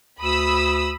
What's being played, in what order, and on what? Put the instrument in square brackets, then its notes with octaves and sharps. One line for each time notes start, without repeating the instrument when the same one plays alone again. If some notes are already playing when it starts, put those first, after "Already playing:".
[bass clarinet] D2 [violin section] B5 D#6 E6